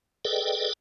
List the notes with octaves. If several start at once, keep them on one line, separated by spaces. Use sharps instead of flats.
G#4 A4 B4 D5 D#5 G5